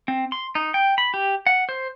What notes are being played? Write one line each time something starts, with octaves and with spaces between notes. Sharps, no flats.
C4
C6
D#4
G5
B5
G4
F#5
C5